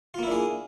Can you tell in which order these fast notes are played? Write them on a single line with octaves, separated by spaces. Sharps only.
F4 A#3 E4 D4 G#4